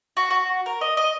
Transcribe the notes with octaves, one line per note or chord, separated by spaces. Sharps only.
F#4
F#4
A#4
D#5
D#5